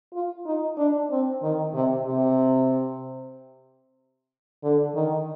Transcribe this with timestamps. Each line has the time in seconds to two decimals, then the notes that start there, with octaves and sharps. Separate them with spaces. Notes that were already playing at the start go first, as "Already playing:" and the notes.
0.13 F4
0.46 D#4
0.77 D4
1.10 C4
1.42 D#3
1.74 C3
2.06 C3
4.63 D3
4.95 D#3